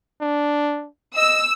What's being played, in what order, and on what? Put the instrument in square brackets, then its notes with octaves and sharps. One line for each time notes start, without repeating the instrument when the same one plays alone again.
[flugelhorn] D4
[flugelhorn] D#5 [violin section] E6